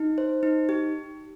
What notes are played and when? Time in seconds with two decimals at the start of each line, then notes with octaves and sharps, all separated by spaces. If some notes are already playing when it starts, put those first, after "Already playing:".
Already playing: D#4
0.18 C5
0.43 D#4
0.69 G4